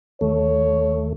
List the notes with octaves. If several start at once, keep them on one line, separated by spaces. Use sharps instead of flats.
D#2 A3 C#5